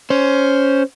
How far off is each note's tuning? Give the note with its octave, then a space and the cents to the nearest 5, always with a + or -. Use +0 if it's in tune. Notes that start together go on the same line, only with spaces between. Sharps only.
C#4 +10 C5 +0